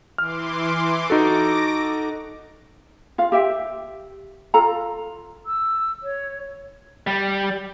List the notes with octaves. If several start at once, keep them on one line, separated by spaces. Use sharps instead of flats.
E3 C6 D6 F6
D#4 F#4 A4 D6 A#6 D7
F4 F5
G4 E5 G5
F4 A4 A#5
E6
C#5
G3